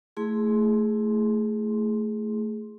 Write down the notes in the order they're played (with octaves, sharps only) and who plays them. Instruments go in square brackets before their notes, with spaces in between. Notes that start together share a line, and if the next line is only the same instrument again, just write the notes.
[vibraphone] A3 E4 G#4 C6